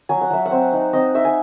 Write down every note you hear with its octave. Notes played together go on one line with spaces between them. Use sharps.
F#3 G#5
F#5
F#3 E5
F#5
C4
D#4
C4 D#5
D#4 E5
G#5